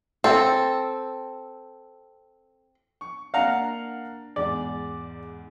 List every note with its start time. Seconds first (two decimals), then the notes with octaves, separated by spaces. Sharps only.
0.24 C4 A4
3.01 C#6
3.34 A#3 D4 F5 F#5 A#5
4.36 E2 G#2 D5